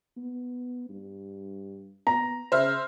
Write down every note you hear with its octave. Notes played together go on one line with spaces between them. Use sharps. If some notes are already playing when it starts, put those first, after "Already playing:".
B3
G2
B3 A#5
C#3 C5 E5 F6